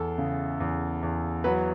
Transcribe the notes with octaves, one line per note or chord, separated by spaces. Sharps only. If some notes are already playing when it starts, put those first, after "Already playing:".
Already playing: E2 A4
C#3
E2
E2
F#3 B4